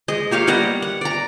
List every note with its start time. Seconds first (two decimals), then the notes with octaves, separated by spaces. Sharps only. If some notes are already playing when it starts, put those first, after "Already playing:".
0.08 G#3 D#5
0.31 A#3 G4 C#5 F5
0.47 G3 B3 D#5 F#5
0.82 F#5
1.01 D5 A#5